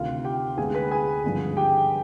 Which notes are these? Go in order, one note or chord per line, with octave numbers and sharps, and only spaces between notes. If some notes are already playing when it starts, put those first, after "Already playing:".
Already playing: D2 C3 D#3 F4 F5
G4 G5
D2 D3 G#3 B3 G#4 G#5
B4 B5
G#4 G#5
G#1 G2 D3 F3
G4 G5